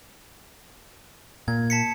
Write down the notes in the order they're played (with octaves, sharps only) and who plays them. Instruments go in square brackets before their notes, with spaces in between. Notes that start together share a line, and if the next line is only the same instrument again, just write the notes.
[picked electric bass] A#2 [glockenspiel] G#6
[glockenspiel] A5 B6 C#7